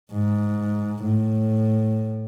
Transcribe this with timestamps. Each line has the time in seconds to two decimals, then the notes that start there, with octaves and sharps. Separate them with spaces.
0.12 G#2
1.04 A2